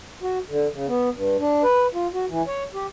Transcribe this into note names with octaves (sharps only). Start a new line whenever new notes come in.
F#4
D3
C#3
B3
G2
D4
B4
F4
F#4
E3
C#5
G4